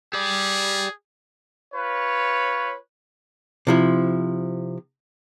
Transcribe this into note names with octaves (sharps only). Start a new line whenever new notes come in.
G4 G#4 D5
F4 B4 C#5
C3 F3 E4